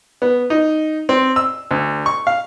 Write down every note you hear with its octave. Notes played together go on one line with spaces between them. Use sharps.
B3
D#4
C4
E6
D2
C#6
F5